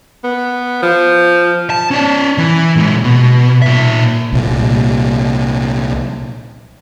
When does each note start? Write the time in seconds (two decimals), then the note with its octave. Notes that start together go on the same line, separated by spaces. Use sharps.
0.24 B3
0.82 F3
1.70 A5
1.91 C#4 D5
2.38 E3
2.76 A#2 G#3
3.04 B2
3.62 A#2 E5
4.32 C2 A#2